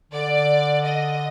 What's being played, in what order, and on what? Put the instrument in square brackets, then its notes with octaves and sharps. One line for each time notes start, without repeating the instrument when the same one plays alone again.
[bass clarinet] D3 [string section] D5
[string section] D#5